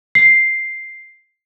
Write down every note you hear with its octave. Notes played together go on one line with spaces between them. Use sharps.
C7